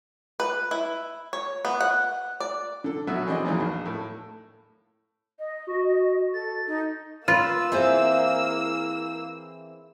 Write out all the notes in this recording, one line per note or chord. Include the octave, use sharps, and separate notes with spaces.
B4
E4
C#5
B3
F#5
D5
D3 A4
B2 F#3 F#4 E5
E3 C4 D4 G#4 D#5
E2 D#3 E3 F#3 A#3
A#1
A2
D#5
F#4
A4 A6
D#4
A#3 F4 B4 E6
E3 C4 G#4 C5 E5 F5